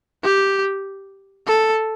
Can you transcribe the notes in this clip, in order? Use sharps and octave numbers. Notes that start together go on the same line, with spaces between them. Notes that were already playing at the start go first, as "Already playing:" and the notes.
G4
A4